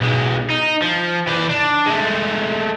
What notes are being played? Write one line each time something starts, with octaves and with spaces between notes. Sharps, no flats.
B1 G#3
D#4
F3
E3 D5
D4
G#3 A3